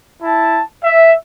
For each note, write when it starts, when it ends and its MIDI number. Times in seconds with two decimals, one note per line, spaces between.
0.23 0.63 64
0.23 0.63 81
0.84 1.14 76